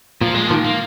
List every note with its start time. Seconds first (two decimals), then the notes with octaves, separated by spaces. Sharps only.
0.21 A#2 F3
0.35 G#3
0.48 F3
0.50 A#2 D#3
0.64 A#3